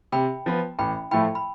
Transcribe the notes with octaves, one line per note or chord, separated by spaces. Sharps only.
C3 G5 B5
F3 B3
A1 G5 B5
A2 F3 A3 E4 G5 B5
B5